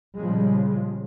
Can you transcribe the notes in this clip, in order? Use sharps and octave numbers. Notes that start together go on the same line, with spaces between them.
A#2 C#3 F3 G3 G#3